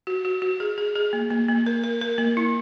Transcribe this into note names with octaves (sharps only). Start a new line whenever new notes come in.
F#4
F#4
F#4
G#4
G#4
G#4
A#3
A#3
A#3
A#4
A#4
A#4
A#3
E4